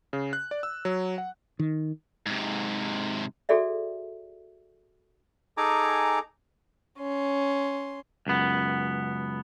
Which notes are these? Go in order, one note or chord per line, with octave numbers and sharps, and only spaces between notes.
C#3
F#6
D5
E6
F#3
F#5
D#3
G#2 C3
F#4 G#4 A4 D5 E5
D#4 G#4 A4 G#5 A#5 D6
C#4 C6
C#2 F#2 B3